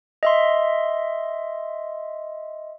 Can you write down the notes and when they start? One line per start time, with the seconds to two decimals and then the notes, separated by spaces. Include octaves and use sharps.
0.23 D#5 E5 C6